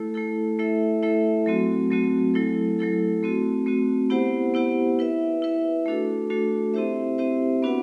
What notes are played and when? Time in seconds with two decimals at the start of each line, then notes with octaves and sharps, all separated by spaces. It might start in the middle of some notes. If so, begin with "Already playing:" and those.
Already playing: A3 E4 A4
0.14 A3 E4 A4
0.59 A3 E4 A4 E5
1.03 A3 E4 A4 E5
1.46 F#3 A3 C4 F#4
1.91 F#3 A3 C4 F#4
2.34 F#3 A3 E4 A4
2.79 F#3 A3 E4 A4
3.23 A3 C4 F#4
3.66 A3 C4 F#4
4.10 B3 E4 G4 C5 F#5
4.54 B3 E4 G4 C5 F#5
4.99 E4 B4 E5
5.42 E4 B4 E5
5.86 A3 D4 F#4 A4
6.30 A3 D4 F#4 A4
6.74 C4 E4 G4 C5 E5
7.18 C4 E4 G4 C5 E5
7.62 B3 D4 F#4 B4 F#5